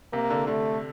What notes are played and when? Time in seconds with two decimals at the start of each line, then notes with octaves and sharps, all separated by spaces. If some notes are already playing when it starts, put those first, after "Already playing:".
0.13 C3 A#3
0.30 D3
0.47 D3 A3